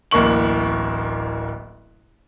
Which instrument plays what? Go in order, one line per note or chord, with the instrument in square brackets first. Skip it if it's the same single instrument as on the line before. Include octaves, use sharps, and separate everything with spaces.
[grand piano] D1 A1 A#3 C#6 F#7